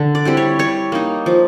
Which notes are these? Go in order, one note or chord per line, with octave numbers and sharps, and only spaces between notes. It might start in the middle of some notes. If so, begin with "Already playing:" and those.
Already playing: D3
D5
G3 C4 E4
C#5
G3 C#5
A#3 D#4
F3